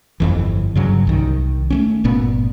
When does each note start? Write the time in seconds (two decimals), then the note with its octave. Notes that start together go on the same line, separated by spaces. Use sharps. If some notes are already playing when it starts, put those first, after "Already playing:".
0.20 G1 F2 E3
0.75 G2 C#3 F#3
1.07 C2 D#3
1.70 A3 B3 C#4
2.04 G1 A#2 B3